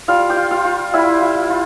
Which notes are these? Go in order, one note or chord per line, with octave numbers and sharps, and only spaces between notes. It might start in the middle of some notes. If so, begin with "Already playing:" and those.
G3 F4 F5
G4 G5
F4
F4 F5
F4
G3 E4 E5
F4
F4